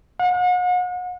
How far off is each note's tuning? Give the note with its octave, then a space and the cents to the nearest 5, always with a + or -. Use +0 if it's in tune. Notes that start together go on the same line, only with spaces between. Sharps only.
F#5 -40